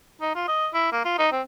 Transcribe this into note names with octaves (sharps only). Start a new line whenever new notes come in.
D#4
F4
D#5
E4
A#3
F4
D#4
C4